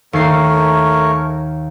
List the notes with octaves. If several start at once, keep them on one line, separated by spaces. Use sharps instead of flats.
D#2 A3 A#4 C#5 C7